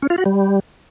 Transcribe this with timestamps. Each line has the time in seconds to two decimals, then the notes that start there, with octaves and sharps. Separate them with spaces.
0.02 C#4
0.10 F4
0.18 F#4
0.26 G3